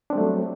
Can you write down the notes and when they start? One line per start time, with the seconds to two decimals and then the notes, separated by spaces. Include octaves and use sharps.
0.10 D4
0.13 C4
0.15 G3
0.18 A3
0.20 F#3